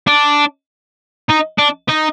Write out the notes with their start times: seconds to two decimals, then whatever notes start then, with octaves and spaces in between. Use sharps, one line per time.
0.07 D4
1.29 D#4
1.58 D4
1.89 D#4